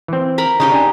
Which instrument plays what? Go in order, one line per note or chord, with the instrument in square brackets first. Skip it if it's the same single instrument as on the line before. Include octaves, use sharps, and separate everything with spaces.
[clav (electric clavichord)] E3 C4
[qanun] A#4 A#5 B5
[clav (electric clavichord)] C#3 [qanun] D#4 G4 D#5
[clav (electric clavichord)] D4 G#5